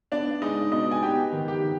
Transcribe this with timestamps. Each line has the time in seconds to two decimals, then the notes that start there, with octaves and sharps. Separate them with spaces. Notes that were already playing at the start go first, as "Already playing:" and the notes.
0.12 B3 D4 D5
0.42 G#3 D#4 D#5
0.72 B2 D#4 D#5
0.91 G#5
1.03 B3 G4 G5
1.32 D#3
1.48 G4 G5
1.63 D#3